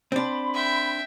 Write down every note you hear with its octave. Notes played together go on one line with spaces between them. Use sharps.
C4 D4 B5 C6
E5 G5